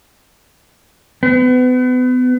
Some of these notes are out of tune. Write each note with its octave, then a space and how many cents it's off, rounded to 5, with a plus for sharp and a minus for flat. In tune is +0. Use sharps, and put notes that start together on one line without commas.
B3 +35